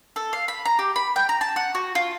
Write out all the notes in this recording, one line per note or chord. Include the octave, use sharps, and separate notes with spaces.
A4
F5
B5
A#5
G4
B5
G5
A#5
A5
F#5
F#4
F4